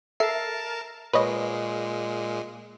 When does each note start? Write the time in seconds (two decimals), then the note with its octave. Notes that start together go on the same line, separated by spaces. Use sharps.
0.20 A4 A#4 E5 A5 C7
1.13 A#2 G#3 B4 C#5 D#5